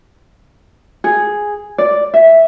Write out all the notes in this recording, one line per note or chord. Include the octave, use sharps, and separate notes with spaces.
G#4
D5
E5